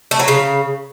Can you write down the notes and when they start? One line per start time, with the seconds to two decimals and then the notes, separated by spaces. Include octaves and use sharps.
0.11 A3
0.20 F#3
0.28 C#3